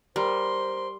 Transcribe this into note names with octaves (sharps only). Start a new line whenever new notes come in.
G3 A#4 C5 C6